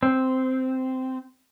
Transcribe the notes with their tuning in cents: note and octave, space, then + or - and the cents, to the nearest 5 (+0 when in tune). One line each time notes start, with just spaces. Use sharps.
C4 -10